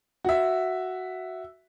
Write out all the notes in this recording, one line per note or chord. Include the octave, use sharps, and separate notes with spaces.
F#4 E5